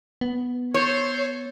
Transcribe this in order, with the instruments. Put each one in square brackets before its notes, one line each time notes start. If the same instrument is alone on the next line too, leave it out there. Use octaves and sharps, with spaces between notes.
[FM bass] B3
[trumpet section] A4 C5 [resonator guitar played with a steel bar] C#5